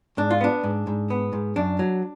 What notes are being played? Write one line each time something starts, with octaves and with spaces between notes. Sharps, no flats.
G#2 D4
F4
B3 D4
G#2
G#2
B3
G#2
F#2 D4
F#3